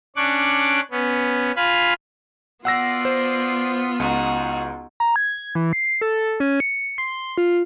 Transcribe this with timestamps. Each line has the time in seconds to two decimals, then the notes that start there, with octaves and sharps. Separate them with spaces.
0.16 C#4 D4 C#6 D6 F#6
0.91 B3 C#4
1.56 F4 F5 G#5 B5 F6
2.65 B3 F4 D5 F#5 E6 A#6 C7
3.05 C5
4.00 C#2 D#4 F#4
5.00 A#5
5.16 G#6
5.38 G#6
5.55 E3
5.73 C7
6.01 A4
6.40 C#4
6.60 C#7
6.98 C6
7.38 F4